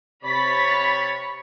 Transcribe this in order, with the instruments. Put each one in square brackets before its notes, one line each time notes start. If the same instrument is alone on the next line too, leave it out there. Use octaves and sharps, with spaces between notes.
[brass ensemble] C3 C#5 [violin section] B5 A6 B6